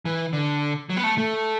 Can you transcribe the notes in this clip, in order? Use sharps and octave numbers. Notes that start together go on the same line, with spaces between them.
E3
D3
F#3
B3
A3
A3